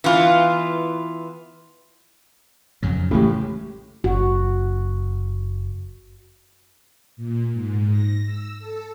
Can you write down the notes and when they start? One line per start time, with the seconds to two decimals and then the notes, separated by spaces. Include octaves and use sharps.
0.04 E3 B3 F4
2.83 F2 C#3 F#3
3.11 A1 A2 C#3 E3 G#3 G4
4.04 F#1 F#4
7.16 A#2
7.53 G#2
7.91 A#6
8.25 E6
8.59 A4